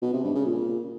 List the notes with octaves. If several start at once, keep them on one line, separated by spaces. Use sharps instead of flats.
B2
C3
G2
C#3
A#2